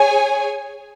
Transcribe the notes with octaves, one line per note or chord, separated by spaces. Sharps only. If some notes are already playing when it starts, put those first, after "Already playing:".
Already playing: G#4 C#5 G#5